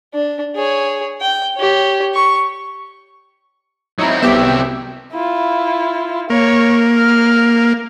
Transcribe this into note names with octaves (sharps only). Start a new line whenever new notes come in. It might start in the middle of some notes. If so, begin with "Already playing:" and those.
D4
G#4 C#5
G5
G4 C#5
C#6
F#3 C4 D#4 E4
C2 B3 G4 E5
E4 F4
A#3 C#5
F6